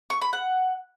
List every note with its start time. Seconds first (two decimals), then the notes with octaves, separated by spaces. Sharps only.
0.10 C#6
0.21 B5
0.33 F#5